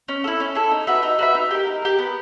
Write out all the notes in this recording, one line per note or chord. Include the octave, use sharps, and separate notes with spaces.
C#4
E4 A4
C#4
E4 A4
D#4
F#4 B4 E5
D#4
F#4 B4 E5
D#4
G4 A#4
D#4
G4 A#4
B3